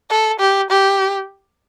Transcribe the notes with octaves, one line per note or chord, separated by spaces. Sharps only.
A4
G4
G4